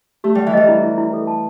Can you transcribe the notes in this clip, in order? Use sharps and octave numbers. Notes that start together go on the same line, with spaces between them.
A3 G4
G3 F#5
E3
G3 D#5
E4
E4
E4
A4
A5